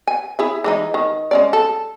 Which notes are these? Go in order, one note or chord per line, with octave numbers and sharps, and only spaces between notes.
G#5
E4 G#4 E5
E3 G#3 D#4
D#3
G#3 C#4 D5
A4